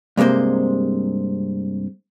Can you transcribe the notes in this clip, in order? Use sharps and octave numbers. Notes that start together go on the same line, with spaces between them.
G2 C3 G#3 A#3 C5